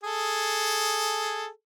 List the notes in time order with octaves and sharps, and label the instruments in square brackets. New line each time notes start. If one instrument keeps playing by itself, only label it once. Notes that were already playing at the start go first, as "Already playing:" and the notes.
[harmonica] G#4 A4